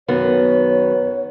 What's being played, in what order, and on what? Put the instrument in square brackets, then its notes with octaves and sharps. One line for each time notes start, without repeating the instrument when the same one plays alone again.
[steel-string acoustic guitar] F#2 D#3 B3 [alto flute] C#5